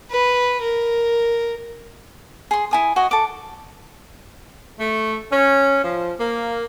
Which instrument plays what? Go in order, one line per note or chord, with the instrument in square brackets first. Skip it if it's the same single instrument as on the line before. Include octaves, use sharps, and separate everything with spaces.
[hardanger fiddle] B4
A#4
[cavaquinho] G#4 C6
E4 G#5 D#6
F#4 D#5 G#5
A4 D6
[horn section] A3
C#4
F3
A#3